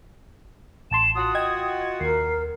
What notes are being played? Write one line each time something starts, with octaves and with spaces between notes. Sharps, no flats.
A1 A5 C6 E7
F4 F#4 D#6
D#5 G5 G#6
D#2 A#4 C7